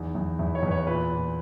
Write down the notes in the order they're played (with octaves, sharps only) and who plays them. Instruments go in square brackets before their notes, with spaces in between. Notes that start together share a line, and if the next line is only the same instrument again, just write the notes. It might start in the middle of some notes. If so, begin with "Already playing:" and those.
Already playing: [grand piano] E2 D#4
E2
E2 E4
C#5
E2 B4
C#5
A#2 B4
A#2